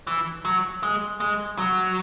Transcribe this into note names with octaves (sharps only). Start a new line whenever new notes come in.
E3
F#3
G#3
G#3
F#3